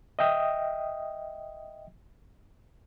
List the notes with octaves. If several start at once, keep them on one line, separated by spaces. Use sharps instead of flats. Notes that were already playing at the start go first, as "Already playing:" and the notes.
D#5 E5 G5 D#6